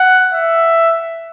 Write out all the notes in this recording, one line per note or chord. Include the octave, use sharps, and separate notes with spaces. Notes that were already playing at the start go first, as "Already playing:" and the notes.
Already playing: F#5
E5